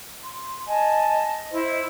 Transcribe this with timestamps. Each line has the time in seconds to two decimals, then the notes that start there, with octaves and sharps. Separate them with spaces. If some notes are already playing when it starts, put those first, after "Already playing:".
0.24 C6
0.68 D#5 G#5 A5
1.10 D#5
1.51 E4 C5